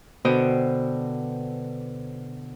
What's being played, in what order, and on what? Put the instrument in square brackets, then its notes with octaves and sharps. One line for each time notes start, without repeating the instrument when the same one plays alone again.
[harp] B2 D3 B3 C5 G5 D#6